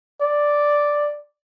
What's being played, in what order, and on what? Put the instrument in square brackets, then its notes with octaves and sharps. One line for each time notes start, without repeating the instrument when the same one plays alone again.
[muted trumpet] D5